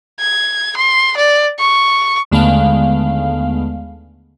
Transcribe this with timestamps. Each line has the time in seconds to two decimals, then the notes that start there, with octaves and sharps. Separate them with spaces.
0.20 G#6
0.76 C6
1.17 D5
1.59 C#6
2.32 D#2 D3 G#3 A3 B3 F5